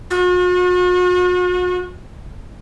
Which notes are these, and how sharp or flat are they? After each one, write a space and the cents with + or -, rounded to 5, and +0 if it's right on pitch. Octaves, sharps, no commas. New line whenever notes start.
F#4 -45